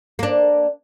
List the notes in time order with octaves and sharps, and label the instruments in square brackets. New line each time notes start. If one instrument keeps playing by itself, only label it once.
[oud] A#3 D4